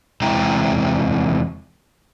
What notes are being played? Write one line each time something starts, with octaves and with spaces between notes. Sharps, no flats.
E2 C3 G#3 E4 G5 A#5